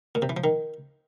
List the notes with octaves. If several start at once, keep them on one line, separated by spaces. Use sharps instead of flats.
A#2
C3
E3
F3
D#3